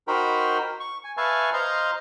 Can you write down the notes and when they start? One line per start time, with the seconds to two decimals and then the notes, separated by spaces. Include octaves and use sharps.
0.08 D#4 F#4 A#4 C5 G5 B5
0.80 C#6
1.04 G#5
1.17 B4 E5 F5 G#5 A5 C#6
1.53 C5 D#5 F5 A#5 C6